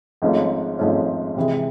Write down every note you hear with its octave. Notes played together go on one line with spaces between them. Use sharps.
G#1 G#2 F3 A3 C#4
G#1 G#2 F3 A3 C#4
C3 E3 G#3